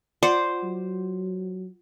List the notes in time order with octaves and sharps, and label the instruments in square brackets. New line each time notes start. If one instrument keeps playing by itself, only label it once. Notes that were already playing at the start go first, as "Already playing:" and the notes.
[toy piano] F4 F#5 [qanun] C5 [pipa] D5
[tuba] F#3